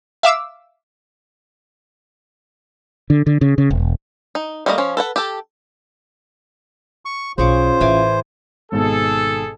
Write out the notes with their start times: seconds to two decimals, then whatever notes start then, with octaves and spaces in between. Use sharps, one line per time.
0.23 E5 F5 D6 E6
3.10 D3
3.26 D3
3.41 C#3
3.58 C#3
3.71 E1
4.35 D#4
4.66 G3 A3 A#3 D5 D#5
4.78 F3 C#4
4.97 A4 B4 F#5
5.16 G4 A4
7.05 C#6
7.38 B1 C#4 F4 G#4 C5 C#6 D6
7.81 A1 E3 G#5 D6
8.72 G#1 G#2 B2 G#4 A4